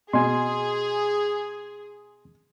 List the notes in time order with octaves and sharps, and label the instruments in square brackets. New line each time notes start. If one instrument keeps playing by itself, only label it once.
[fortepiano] B2 [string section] G#4 [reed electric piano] G#5 C6